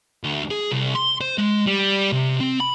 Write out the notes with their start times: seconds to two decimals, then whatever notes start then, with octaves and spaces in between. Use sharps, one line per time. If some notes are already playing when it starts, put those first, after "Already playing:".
0.24 D2
0.51 G#4
0.71 C2
0.95 C6
1.21 C5
1.38 G#3
1.67 G3
2.12 C3
2.40 C4
2.61 B5